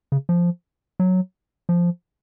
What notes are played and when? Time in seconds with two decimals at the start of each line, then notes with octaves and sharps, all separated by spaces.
0.12 C#3
0.29 F3
1.00 F#3
1.69 F3